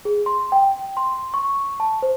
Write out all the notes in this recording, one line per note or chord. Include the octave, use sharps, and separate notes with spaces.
G#4
C6
G5
C6
C#6
A5
C5